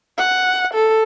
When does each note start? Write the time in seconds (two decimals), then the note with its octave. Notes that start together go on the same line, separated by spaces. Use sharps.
0.18 F#5
0.74 A4